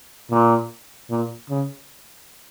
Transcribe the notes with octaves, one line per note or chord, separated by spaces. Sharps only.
A#2
A#2
C#3